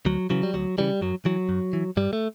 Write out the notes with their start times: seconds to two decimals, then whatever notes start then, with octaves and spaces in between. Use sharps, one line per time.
0.06 D2 F#3
0.30 C#3 E3 F#3
0.43 G3
0.54 D2 F#3
0.78 C#3 E3 G3
1.01 F#2 F#3
1.25 E3 F#3
1.49 F#2
1.73 E3
1.97 G2 G3
2.13 A3